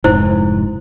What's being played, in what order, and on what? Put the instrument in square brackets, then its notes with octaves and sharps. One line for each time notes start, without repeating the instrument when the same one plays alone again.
[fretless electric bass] F1 G#2 [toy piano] E4 C5